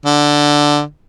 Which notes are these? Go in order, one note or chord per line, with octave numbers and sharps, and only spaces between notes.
D3